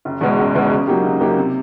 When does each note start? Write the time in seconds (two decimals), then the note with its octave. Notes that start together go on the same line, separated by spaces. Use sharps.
0.05 F#1
0.21 E2 B2 G#3 B3
0.38 F#1
0.55 E2 B2 G#3 B3
0.70 C#3
0.87 F#3 A#3 D#4 G4
1.04 C#3
1.20 F#3 A#3 D#4 G4
1.38 C3